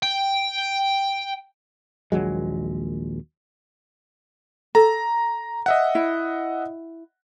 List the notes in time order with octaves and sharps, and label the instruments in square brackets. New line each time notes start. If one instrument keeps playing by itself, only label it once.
[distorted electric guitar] G5
[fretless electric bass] A#1 D#2 F#3 G#3
[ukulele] A4 [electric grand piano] A#5
[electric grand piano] D#5 E5 F#5
[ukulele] E4